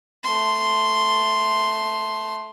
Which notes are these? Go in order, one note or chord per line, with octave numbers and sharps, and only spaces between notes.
A3 C6